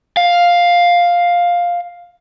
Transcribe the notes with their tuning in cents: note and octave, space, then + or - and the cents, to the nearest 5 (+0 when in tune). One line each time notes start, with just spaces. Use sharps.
F5 +5